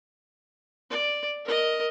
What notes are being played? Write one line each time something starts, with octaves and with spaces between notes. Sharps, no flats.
D5
A#4 D#5